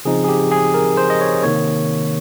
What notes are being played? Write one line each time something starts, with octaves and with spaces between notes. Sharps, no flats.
C#3 F3 C4 D#4 G#4
G#4
G4
G#4
A#4
C5
D#5
C#5
C3 D#3 A#3 C#5